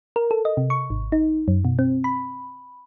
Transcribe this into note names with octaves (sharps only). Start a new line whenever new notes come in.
A#4
A4
D#5
C3
C#6
G#1
D#4
F#2
B2
C4
B5